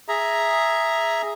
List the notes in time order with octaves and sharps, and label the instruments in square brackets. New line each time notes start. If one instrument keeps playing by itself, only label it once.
[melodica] G#4 E5 A#5